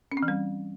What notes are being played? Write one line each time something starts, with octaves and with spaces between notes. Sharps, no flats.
C#4
C4
E3
G3